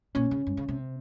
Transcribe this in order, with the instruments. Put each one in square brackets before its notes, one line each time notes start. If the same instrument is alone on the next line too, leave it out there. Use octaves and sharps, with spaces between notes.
[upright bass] A#2 [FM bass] C#4
[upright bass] C#3
G2
C#3
C3
[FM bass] C4